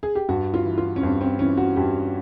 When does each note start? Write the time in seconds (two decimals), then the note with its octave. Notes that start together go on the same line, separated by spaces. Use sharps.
0.03 G#4
0.15 G4
0.29 G2 F#4
0.54 F4
0.65 E3
0.78 F4
0.96 C#4
1.03 G2 C4
1.21 C4
1.39 E3 C#4
1.57 F#4
1.76 G2 G4